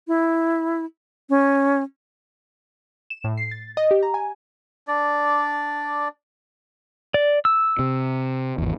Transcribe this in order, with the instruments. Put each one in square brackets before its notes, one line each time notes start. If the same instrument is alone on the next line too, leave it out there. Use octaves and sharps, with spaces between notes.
[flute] E4
C#4
[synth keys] E7
A2
C7
A6
D#5
G4
A#5
G#5
[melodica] D4 D5
[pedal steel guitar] D5
E6
[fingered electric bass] C3
G#1 E2